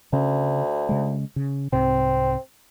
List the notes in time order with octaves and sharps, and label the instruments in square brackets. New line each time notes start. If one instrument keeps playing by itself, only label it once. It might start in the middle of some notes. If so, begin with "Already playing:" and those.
[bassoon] D2 [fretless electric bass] C#3 C#4
[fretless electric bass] C#3 G#3
C#3
[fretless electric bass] C2 G#2 C3 [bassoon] C4